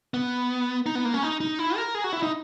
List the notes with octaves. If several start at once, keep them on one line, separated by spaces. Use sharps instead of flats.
B3
D#4
B3
A#3
C#4
D#4
D#4
E4
A#4
G#4
F#4
E4
D#4